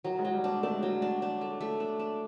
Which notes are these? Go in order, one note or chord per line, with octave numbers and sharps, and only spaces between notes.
D#3 F#3
G#3
F#3
G3
G#3 D4
A3 D4
G#3
F#3 G3
G#3
D4
D4
A3
A3
D4
D4